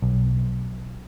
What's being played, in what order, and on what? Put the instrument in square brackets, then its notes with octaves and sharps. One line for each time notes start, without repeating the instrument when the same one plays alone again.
[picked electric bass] B1